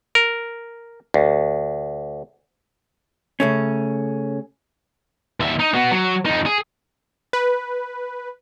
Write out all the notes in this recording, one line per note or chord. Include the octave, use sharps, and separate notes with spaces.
A#4
D2
C#3 A3 C#4
D#2 E5
D#4
B3 F#4
F#3
F2 D#4
G#4
B4